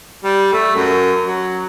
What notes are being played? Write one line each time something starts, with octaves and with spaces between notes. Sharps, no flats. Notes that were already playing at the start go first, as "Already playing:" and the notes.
G3
A3
F#2
F#3